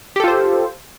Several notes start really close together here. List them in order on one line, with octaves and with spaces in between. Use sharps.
G4 A4 F4 C5